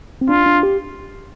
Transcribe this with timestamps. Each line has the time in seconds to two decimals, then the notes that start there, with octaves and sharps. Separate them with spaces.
0.21 C4
0.29 D4 F4
0.46 D4
0.63 G4